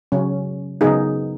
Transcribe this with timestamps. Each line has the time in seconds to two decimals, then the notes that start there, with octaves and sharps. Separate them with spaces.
0.12 C#3 F#3 C#4
0.81 C#3 F#3 B3 D#4 G#4